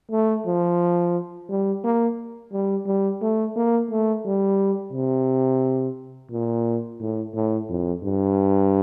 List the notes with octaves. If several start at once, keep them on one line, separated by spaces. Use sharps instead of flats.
A3
F3
G3
A#3
G3
G3
A3
A#3
A3
G3
C3
A#2
A2
A2
F2
G2